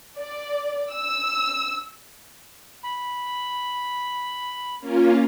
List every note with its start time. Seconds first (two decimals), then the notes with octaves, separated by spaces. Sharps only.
0.19 D5
0.93 E6
2.83 B5
4.80 A#3 C#4 F4